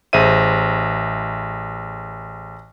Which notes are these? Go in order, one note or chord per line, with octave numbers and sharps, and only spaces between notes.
A1 G#4 C5 E5 D#7